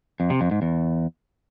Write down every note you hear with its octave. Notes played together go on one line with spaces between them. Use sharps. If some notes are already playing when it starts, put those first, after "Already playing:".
F2
C3
F2
G#2
E2